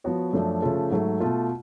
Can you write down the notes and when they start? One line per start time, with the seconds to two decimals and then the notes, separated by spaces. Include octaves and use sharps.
0.04 F3 B3 F#4 C#5
0.33 F#2 F3 A3 D4
0.62 C#3 F3 A3 F4 A4
0.91 G#2 F#3 A3
1.20 B2 A3 F4